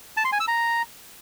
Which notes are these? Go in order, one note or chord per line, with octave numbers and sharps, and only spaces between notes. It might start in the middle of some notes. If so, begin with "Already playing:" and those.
A5
C6
G#5
E6
A#5